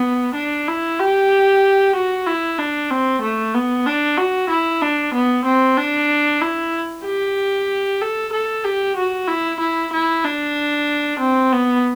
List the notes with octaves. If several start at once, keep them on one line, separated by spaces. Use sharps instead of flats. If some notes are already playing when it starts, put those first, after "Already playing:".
Already playing: B3
D4
E4
G4
F#4
E4
D4
C4
A3
B3
D4
F#4
E4
D4
B3
C4
D4
E4
G4
A4
A4
G4
F#4
E4
E4
E4
D4
C4
B3